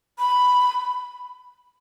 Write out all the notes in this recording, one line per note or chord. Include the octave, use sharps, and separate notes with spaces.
B5